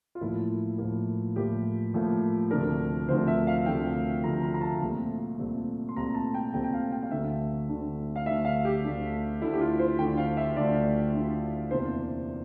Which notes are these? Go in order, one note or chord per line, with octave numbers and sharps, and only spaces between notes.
F4
A2 F3 A#3 E4
A2 F3 A#3
A2 F3 A#3 G4
A2 F3 A#3
D2 C3 F3 A3 D4 A#4
D2 C3 F3 A3 D4 C5
E5
F5
D2 C3 F3 A3 D4 G5
D2 C3 F3 A3 D4 A#5
A#5
A#5
A5
C2 A#2 A3 C4
C2 A#2 A3 C4
C6
C2 A#2 A3 C4 A#5
A5
G5
C2 A#2 A3 C4 G5
G5
F5
G5
F5
D2 D3 A3 D4 E5
D2 D3 A3 D4
F5
D2 D3 A3 D4 E5
F5
G4
D2 D3 A3 D4
D2 D3 A3 D4 E4
G4
F4
C5
D2 D3 A3 D4 G5
F5
E5
D2 D3 A3 D4 D5
D2 D3 A3 D4
E2 C3 E3 A#3 D4 C5